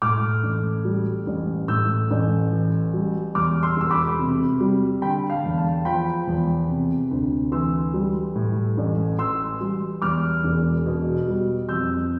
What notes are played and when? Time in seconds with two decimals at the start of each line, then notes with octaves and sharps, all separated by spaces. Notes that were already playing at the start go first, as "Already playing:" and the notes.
0.02 A2 D6 F6
0.43 A1
0.85 G3
1.27 A1
1.68 A2 E6 G6
2.11 A1
2.52 E3
2.94 G3
3.35 E2 D6 F6
3.62 C6 E6
3.77 E1 E6
3.91 B5 D6
4.19 C3
4.60 G3
5.02 D3 G5 B5
5.30 F5 A5
5.44 E2
5.57 F5 A5
5.85 F3 G5 B5
6.27 E2
6.69 C3
7.11 D2
7.52 E3 C6 E6
7.94 G3
8.35 A2
8.77 A1
9.19 E3 C6 E6
9.61 G3
10.02 E2 D6 F6
10.44 E1
10.86 B2
11.27 G3
11.69 F2 E6 G6